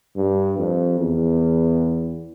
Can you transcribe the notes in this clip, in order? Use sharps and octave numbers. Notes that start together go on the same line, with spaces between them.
G2
F2
E2